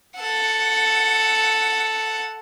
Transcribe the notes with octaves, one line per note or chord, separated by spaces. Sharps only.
A4 F#5